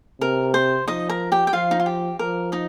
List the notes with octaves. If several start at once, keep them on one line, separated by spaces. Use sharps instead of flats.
C3 A#4
C5
F3 D#4 D#5
A#4 A#5
G4 G5
G5
F3 F4 F5
D#4
F4
G4
F3 A#4
D#4 D#5